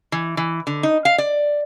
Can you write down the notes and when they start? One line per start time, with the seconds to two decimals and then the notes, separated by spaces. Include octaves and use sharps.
0.12 E3
0.37 E3
0.67 D3
0.83 D#4
1.05 F5
1.18 D5